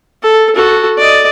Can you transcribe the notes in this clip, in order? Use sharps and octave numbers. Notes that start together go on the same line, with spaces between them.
A4
F#4 A4
D5 D#5